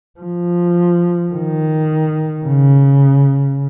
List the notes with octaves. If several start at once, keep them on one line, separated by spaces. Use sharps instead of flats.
F3
D#3
C#3